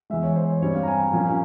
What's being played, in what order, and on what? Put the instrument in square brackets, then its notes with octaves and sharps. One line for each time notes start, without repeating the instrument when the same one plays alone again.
[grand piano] E2 E3 G#3 E5
C#5
C5
C#5
G2 G3 C4 C#5
F5
A#5
G#5
A#2 F3 A#3 C#4